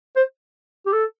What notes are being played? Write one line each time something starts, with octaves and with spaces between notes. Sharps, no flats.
C5
G4
A4